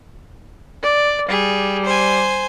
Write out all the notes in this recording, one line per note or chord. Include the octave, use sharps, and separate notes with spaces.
D5
G3 G#4
C5 G#5